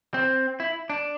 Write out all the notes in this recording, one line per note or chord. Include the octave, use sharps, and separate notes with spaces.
C4
E4
D4